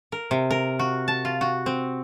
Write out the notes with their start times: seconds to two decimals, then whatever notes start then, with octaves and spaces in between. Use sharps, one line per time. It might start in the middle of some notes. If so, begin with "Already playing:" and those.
0.12 A#4
0.31 C3
0.51 A#4
0.79 F#4
1.08 A5
1.25 F4
1.41 F#4
1.66 C4